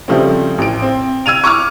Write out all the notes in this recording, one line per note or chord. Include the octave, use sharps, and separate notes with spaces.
C#3 F3 G3 A3 C4
A1 D7
C4
E6 G#6 D#7 F7
C#6 D6 E6 F6